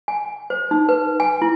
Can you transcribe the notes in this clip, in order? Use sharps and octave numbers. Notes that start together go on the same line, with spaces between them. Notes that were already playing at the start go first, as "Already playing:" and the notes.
G#5
C5
D#4
B4
G#5
E4